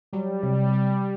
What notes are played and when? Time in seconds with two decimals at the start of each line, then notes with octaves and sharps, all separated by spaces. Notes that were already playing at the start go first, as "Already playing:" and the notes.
0.13 F#3 G3
0.43 C3